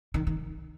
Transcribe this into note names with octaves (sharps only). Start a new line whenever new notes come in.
D#3
D#3